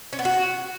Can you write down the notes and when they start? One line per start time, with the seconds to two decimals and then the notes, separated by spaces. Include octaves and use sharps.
0.13 C#4
0.19 B3
0.25 F#4